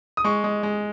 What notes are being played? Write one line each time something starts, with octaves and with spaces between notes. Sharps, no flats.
D#6
G#3 C#6
G#3
G#3